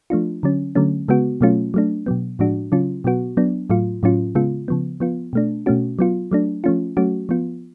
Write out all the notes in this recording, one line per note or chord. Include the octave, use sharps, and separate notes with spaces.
F3 A3 D4 F4
D3 F#3 C#4
D3 F#3 A3 C#4
C#3 G#3 B3 F#4
B2 F#3 A3 C#4 F4
F#3 A3 D4
B2 F#3 B3
A2 F3 G#3 D4 F#4
C#3 F#3 C#4 F4
B2 F#3 B3 F#4
F#3 B3 D4
A2 F#3 A3 F4
A2 F#3 C#4 F4
C#3 G#3 B3 F4
C#3 F3 B3
F3 B3 F4
B2 A3 D4
B2 A3 C#4 F#4
F#3 B3 F4
F#3 A3 D4
F3 A3 C#4 F4
F#3 A3 C#4 F#4
F3 B3 F4